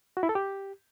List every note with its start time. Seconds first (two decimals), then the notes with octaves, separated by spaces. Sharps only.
0.17 F#4
0.23 E4
0.29 A4
0.35 G4